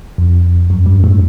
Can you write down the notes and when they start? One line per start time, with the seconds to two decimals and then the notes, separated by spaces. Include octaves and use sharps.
0.18 F2
0.70 F#2
0.86 G2
1.04 A2